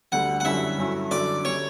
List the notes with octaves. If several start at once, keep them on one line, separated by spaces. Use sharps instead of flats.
D2 D3 G3 F#5
F#5
F#2 D3 G3 C#4 E4 E5
G2 F#3 C#4 E4
F#2 D3 F#3 D5
D3 G3 C#4 C#5